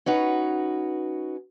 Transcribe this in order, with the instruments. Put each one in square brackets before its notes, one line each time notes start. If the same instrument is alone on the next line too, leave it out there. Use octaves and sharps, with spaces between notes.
[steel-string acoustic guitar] C#4 D#4 F#4 B4